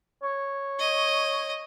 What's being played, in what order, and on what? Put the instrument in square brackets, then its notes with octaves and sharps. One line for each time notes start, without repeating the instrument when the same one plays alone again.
[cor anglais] C#5
[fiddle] D#5